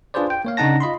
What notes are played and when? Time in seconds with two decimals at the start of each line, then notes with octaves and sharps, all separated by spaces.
0.14 D4 F4 G#4 B4 C5 D5
0.30 G5
0.45 A#3 C#5 F5
0.57 C#3 D4 D#4 F#5 A5 A#6
0.80 F4 D#5 B5 C6